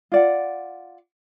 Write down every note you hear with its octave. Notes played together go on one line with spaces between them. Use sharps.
F4 D5 F#5